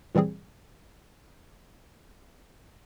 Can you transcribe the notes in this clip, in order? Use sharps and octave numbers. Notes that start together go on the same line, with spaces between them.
A#2 E3 G3 C4 G#4